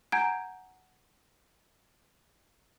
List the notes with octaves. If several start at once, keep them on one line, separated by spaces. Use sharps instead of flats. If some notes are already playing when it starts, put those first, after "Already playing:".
F#5 G#5 A#5 G6 G#6 D7